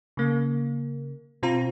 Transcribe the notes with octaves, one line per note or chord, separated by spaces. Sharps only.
C#3 A#3
B2 C4 F4 A#5